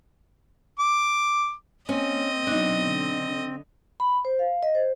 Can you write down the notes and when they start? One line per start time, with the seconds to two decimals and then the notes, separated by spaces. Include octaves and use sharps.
0.79 D6
1.89 A#3 C4 C#4 D#5
2.47 B2 F#3 D4 D#4
2.84 D3
4.00 B5
4.25 C5
4.39 F5
4.63 D#5
4.75 C5